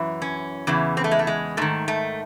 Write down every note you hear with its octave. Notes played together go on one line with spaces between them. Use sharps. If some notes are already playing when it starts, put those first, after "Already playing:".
Already playing: F#2 E3
C#4
E2 C#3 E3
C4
A3
G#3
A3
G#3
G#2 D#3 A3
A3